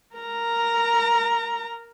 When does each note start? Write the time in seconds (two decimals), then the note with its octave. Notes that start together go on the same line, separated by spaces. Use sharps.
0.16 A#4 A#5